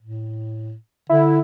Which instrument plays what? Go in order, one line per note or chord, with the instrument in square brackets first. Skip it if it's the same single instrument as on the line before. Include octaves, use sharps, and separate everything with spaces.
[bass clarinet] A2
[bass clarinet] D3 [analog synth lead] E4